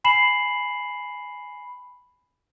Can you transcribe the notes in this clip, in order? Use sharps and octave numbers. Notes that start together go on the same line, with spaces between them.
G#5 B5 C7 E7 F#7